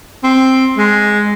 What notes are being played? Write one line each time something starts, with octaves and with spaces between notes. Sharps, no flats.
C4
G#3